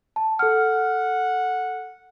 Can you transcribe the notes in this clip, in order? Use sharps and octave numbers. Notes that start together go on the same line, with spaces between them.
A5
A4 F#5 F6